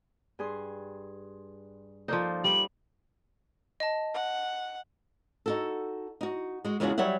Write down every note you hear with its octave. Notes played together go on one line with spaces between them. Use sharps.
G2 G#4 C6
F3 A#3 D#4 A4 C5 D5
G3 F#7
D#5 A5
F#5
D#4 F#4 A4
D#4 F#4
G#3 F#4
E2 C#3 G#3 C#4 F4 F#4
F#3 G3 C#5 E5 F#5